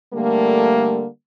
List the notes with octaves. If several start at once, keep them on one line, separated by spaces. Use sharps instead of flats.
D3 G3 A3 A#3